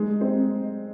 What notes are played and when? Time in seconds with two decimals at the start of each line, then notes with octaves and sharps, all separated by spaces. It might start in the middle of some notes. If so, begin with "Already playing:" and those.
Already playing: G#3 D#4
0.21 C4